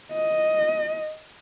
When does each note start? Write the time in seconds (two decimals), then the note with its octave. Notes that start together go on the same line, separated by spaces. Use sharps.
0.12 D#5